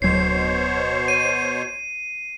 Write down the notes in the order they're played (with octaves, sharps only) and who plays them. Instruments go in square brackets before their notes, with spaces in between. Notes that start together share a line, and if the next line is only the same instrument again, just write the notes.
[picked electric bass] D1 F#3 [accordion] B2 C5 C#5 [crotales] C7
[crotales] D#7